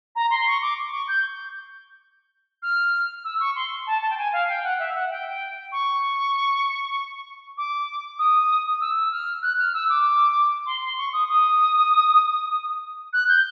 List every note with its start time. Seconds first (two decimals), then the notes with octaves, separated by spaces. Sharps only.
0.15 A#5
0.30 C6
0.46 C#6
0.62 D6
0.92 C#6
1.08 G6
2.62 F6
3.24 E6
3.40 C#6
3.55 C6
3.87 A5
4.02 A5
4.10 G5
4.17 G#5
4.33 F5
4.48 G5
4.63 F#5
4.79 E5
4.95 F#5
5.10 G5
5.72 C#6
7.57 D6
8.18 D#6
8.81 E6
9.12 F6
9.42 F#6
9.58 F6
9.74 E6
9.89 D6
10.66 C6
10.82 C6
10.97 C#6
11.13 D#6
11.28 D#6
13.13 F#6
13.28 G6